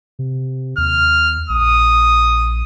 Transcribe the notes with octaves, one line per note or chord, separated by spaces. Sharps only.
C3
D#2 F6
A#1 D#6